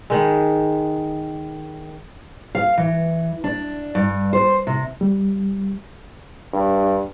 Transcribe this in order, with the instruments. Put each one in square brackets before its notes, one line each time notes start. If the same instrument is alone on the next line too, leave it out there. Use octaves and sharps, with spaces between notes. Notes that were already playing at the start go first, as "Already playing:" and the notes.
[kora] D#3 G#3
[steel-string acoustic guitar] F5
E3
D4
G2
C5
C3
[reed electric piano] G3
[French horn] G2